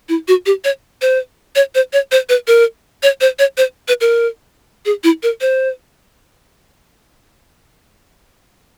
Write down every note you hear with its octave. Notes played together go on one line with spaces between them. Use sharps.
E4
F#4
G4
C#5
C5
C#5
C5
C#5
C5
B4
A#4
C#5
C5
C#5
C5
B4
A#4
G#4
E4
A#4
C5